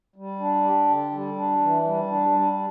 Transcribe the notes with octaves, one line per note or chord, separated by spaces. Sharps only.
G3
D4
G4
D3
G3
D4
E3
G3
D4
G3